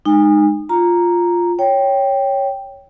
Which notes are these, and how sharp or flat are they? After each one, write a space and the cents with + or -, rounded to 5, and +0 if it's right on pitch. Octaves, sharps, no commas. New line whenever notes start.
G#3 +0 D#4 -25 G#5 -35
F4 +0 A#5 +0
C#5 +0 G5 +0